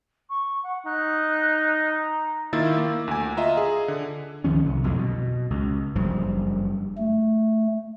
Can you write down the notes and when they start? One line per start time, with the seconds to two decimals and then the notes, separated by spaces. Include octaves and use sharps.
0.30 C#6
0.63 F#5
0.86 D#4 F#6
1.90 A#5
2.53 D#3 A#3 E4 F4 E6 A6
2.78 A#3
3.08 D2 G#5
3.37 F4 D#5 E5 A#5
3.57 G#4
3.88 D3
4.44 C#2 D#3 F3 C#4
4.65 C2
4.84 B1 F2 A2 D3
4.98 B2
5.50 C#2
5.95 F#1 G2 F3
6.98 A3